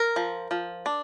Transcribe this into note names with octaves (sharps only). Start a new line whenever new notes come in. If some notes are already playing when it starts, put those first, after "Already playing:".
Already playing: A#4
F3
F3
D4